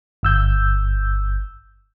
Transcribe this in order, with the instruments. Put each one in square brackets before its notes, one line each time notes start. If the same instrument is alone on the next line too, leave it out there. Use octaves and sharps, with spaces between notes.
[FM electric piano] G1 E6 G6